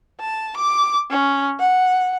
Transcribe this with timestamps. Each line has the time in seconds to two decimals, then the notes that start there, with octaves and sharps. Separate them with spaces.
0.20 A5
0.57 D6
1.11 C#4
1.59 F#5